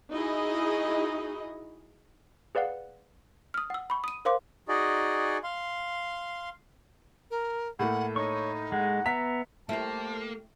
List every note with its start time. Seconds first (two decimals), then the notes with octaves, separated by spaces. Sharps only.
0.12 D#4 E4 F#4 G#4 D#5
2.55 G#4 B4 D5 F5 F#5
3.54 D#6 F6
3.70 F#5 E6
3.90 B5 C#6
4.04 D#6 D#7
4.25 A#4 C5 F5 C6 D6
4.68 D#4 F#4 G#4 D5 D#5
5.44 F5 C6
7.31 A#4
7.79 A2 A3 A#3 F#5
8.16 D#4 C#5 C#6
8.72 G#3 F#5
9.06 B3 E5 A#5 B6
9.69 A3 A#3 E4 G4 C5 E5 A5